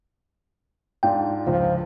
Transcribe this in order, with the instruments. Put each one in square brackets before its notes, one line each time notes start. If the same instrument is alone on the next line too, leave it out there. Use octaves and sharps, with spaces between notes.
[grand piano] G#2 D4 F4 [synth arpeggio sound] G5
[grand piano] C#2 [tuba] F3